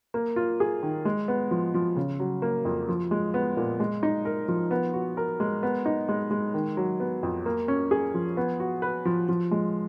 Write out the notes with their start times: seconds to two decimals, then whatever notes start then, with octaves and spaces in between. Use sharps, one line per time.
0.14 A#3
0.36 F4
0.60 G#4
0.83 D#3
1.05 G#3
1.28 B3
1.51 F3
1.74 F3
1.96 C#3
2.19 F#3
2.42 A#3
2.65 F2
2.89 F3
3.11 G#3
3.34 B3
3.57 A#2
3.80 G#3
4.03 D#4
4.25 A#4
4.48 F3
4.71 B3
4.94 F#4
5.17 A#4
5.40 G#3
5.63 B3
5.86 D#4
6.09 G#3
6.31 G#3
6.54 D#3
6.77 F#3
7.00 B3
7.23 F2
7.46 A#3
7.68 C#4
7.91 G#4
8.14 F3
8.37 B3
8.60 F#4
8.82 B4
9.05 F3
9.29 F3
9.51 G#3